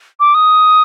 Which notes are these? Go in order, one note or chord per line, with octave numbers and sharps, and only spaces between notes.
D6
D#6